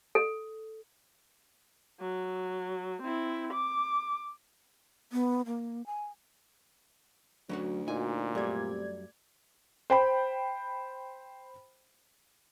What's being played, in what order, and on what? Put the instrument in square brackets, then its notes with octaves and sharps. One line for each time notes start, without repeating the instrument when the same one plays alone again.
[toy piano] A4
[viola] F#3
C4 E4
D6
[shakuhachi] B3
A#3
G#5
[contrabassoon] D2 [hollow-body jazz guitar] F#3 C#4 F#4
[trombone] A#2 [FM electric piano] D#4 F#4 [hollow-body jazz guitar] G#5
[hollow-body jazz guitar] F#2 G3 [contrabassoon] C3 [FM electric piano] A3 D5 G#6
[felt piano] C5 G5 B5